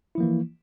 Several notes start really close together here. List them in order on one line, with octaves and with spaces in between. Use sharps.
E4 F3 A#3 E3